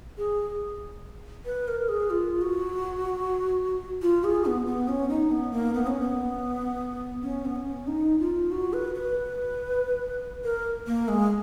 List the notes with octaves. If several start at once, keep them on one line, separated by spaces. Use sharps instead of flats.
G#4
B4
A#4
G#4
F4
F#4
F4
G#4
B3
B3
C#4
D#4
B3
A#3
B3
C#4
B3
C#4
B3
C#4
D#4
F4
F#4
B4
B4
A#4
A#3
G#3